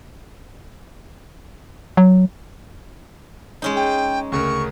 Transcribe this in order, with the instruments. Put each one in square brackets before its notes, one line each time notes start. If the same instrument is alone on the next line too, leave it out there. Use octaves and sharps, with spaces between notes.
[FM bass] F#3
[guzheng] G#3 C#4 D#4
[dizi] G5
[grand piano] D2 C#3 A#4 [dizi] C#6